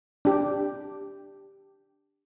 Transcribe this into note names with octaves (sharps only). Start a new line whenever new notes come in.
D4 G4